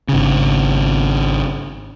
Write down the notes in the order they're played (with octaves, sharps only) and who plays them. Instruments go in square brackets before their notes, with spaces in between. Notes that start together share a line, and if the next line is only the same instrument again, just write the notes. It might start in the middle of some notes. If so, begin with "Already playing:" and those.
[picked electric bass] G#1 C#3